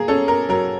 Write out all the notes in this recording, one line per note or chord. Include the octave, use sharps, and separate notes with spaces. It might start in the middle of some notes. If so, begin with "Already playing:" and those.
Already playing: A#3 G#4 A#4
C#4 A4
A#4
F#3 A#4